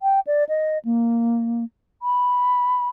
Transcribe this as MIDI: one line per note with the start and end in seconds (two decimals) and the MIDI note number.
0.02 0.20 79
0.27 0.44 74
0.49 0.78 75
0.85 1.64 58
2.02 2.89 83